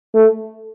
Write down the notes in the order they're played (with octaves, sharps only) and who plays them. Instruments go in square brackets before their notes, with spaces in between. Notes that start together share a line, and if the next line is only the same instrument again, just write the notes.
[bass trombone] A3